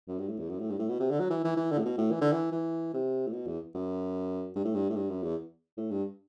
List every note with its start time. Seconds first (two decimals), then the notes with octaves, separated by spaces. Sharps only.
0.08 F#2
0.19 G2
0.28 A2
0.39 E2
0.50 F#2
0.59 A2
0.70 G2
0.79 A2
0.89 B2
1.00 C3
1.10 D3
1.20 F#3
1.30 E3
1.44 E3
1.57 E3
1.71 D3
1.79 A2
1.85 B2
1.98 A2
2.12 E3
2.21 D3
2.32 E3
2.52 E3
2.94 C3
3.27 A2
3.33 B2
3.47 E2
3.75 F#2
4.56 G2
4.65 A2
4.75 G2
4.90 A2
4.96 G2
5.10 F#2
5.23 E2
5.77 A2
5.91 G2